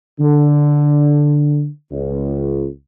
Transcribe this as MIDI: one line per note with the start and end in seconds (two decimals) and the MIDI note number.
0.20 1.67 50
1.91 2.66 37